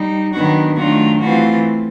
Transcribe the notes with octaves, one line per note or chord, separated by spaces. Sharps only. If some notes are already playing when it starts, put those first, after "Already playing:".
Already playing: G3 D#4
D#3 F#3 B3 D4 F#4
D#3 F#3 A3 D4 F4 F#4
E3 A3 C4 F4 F#4